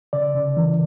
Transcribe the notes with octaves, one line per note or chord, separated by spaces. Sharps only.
C#3 D5
C#3
E3